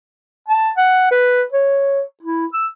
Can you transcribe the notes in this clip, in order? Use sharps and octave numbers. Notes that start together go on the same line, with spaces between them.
A5
F#5
B4
C#5
E4
E6